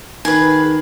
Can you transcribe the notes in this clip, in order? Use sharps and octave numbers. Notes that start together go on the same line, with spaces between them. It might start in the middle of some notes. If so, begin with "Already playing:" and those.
D#3 G#4 B4